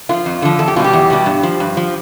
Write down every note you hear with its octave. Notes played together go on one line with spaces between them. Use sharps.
D3 F3 F4
F2
D3 F3
E2 A4
G4
B2 G3 F4 G4
E2
B2 G3
G2
F3
G2
F3